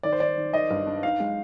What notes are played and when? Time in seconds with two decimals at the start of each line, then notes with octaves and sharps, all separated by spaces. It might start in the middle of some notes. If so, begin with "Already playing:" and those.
0.03 D#3 D5
0.12 C5
0.20 D#3 D5
0.37 D#3
0.53 D#3 D#5
0.70 G2
0.87 D4
1.03 D#4 F5
1.20 G#3